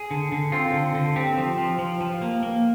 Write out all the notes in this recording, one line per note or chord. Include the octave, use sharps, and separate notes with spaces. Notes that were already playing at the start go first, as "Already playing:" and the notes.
Already playing: G#4
D3
D3
C4 F4
D3
D3
C4 G4
F3
F3
F3
F3
A#3
A#3